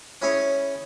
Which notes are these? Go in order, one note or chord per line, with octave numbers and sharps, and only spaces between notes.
C#4 E4 G#4 C#5